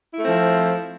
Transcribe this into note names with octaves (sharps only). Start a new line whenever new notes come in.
F3 A3 C4 E4